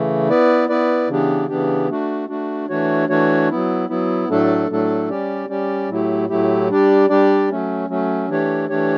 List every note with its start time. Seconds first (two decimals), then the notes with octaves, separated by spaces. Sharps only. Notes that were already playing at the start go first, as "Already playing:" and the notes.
Already playing: C#3 E3 A3
0.29 B3 E4 B4 D5
0.69 B3 E4 B4 D5
1.08 C#3 E3 B3 D4 G4
1.49 C#3 E3 B3 D4 G4
1.89 A3 D4 F#4
2.28 A3 D4 F#4
2.69 E3 A3 D4 F#4 C#5
3.08 E3 A3 D4 F#4 C#5
3.49 F#3 B3 E4
3.89 F#3 B3 E4
4.29 A2 F#3 A3 D4 A4
4.70 A2 F#3 A3 D4 A4
5.10 G3 C#4 G4 D5
5.49 G3 C#4 G4 D5
5.89 A2 F#3 A3 E4 G4
6.29 A2 F#3 A3 E4 G4
6.70 G3 D4 G4 D5
7.09 G3 D4 G4 D5
7.50 F#3 A3 C#4
7.89 F#3 A3 C#4
8.29 E3 A3 D4 G4 C#5
8.69 E3 A3 D4 G4 C#5